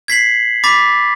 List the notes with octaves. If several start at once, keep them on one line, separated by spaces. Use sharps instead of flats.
G#6 B6 C7 F#7
B5 D6 A6 B6